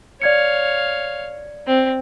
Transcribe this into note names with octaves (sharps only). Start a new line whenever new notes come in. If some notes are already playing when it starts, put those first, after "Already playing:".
C#5 D5 F5 G#6 C#7
C4